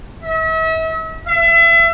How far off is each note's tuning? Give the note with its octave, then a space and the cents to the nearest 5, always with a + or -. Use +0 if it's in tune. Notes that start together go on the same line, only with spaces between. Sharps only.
E5 -40
E5 +30